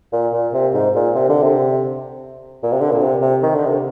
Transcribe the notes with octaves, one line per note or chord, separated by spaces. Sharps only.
A#2
A#2
C3
G#2
A#2
C3
D3
C3
A#2
C3
D3
A#2
C3
C3
D#3
D3
C3